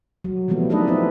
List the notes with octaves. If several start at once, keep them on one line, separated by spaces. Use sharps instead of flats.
F#3
E3 F3 G3 A3 B3
D4 D#4 A4 B4 D#5
C4 E4 B4